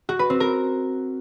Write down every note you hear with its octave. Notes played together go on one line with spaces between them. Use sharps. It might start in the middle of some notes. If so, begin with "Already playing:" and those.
F#4
B4
C4
A#4